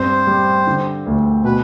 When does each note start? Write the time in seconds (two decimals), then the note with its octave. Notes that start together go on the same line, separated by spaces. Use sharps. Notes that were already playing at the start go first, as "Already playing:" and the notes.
Already playing: G2 C4 C5
0.27 G3
0.67 D3
1.06 D2
1.44 B2 B4